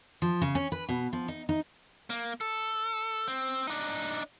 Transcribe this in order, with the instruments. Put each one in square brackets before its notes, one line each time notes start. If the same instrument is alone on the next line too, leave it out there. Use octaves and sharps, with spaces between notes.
[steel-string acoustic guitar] F3
C#3
C#4
B4
B2
F3
D#4
D#4
[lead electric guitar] A#3
A4
C4
D4 D#4